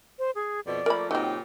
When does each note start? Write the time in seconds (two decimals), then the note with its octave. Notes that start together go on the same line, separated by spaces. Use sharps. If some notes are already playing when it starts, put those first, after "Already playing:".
0.19 C5
0.35 G#4
0.66 F2 B2 D5
0.86 F3 A3 A#3 A#4 B5
1.11 A#2 C#3 F#3 C4 D#4 G4